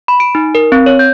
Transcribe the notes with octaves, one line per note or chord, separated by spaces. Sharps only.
B5
D7
D#4
A#4
C4
C#5
G6